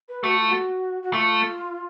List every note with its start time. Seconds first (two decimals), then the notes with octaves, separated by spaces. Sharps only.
0.09 B4
0.23 A3 F#4
0.37 F4
0.50 F#4
1.03 F#4
1.13 A3 F4